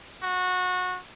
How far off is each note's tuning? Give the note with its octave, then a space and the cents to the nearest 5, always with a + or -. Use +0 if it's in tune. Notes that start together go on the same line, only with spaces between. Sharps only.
F#4 -20